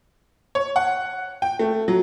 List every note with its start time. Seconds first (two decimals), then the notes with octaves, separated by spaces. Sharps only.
0.55 C#5
0.76 F#5
1.42 G5
1.59 A3
1.88 F#3